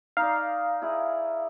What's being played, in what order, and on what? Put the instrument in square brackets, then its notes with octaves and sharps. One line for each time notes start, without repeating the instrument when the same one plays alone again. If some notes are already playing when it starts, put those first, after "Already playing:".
[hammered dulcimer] D#4 D5 [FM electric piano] F5
[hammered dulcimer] E4 G#4